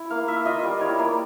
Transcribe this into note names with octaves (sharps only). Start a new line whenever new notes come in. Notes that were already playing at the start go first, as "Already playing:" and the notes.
Already playing: E4
A#3 F5
F4 E5
F4 D#5
G3 D5
E4 C#5
A#3 D5